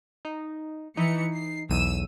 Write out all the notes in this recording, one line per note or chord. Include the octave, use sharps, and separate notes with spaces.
D#4
E3 D#4 C#7
C7
B1 E2 E6 D#7